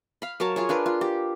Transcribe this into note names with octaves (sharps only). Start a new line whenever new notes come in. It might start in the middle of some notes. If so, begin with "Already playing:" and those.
F5 B5
F#3 A#4 C#5 A5
F4 G#4 C#5
D4 F4 A#4 B4
F4
G4